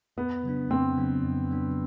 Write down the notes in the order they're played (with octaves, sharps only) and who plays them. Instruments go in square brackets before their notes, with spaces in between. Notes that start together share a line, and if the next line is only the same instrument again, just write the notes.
[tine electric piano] F2 [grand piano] B3
[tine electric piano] C#3 F#3 B3 D4
[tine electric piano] F2 [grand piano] C4
[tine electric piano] C#3 F#3 B3 D4
F2
C#3 F#3 B3 D4